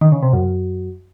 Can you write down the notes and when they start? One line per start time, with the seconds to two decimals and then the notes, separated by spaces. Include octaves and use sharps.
0.01 D#3
0.12 C#3
0.23 C3
0.33 F#2